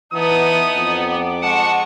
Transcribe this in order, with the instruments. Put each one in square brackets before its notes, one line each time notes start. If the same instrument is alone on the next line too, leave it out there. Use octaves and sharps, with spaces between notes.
[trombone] E3 [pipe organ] B3 [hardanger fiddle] D#4 A5 [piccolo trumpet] D#6
[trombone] F2
[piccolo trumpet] D6
[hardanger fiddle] G#3 C#6 [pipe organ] F#5 A5